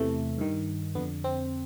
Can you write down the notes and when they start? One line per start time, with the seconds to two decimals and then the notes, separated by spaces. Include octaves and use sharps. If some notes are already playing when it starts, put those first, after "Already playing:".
Already playing: E2 C3 E3 A3
0.38 G2 D#3
0.95 F2 D3 B3
1.24 C4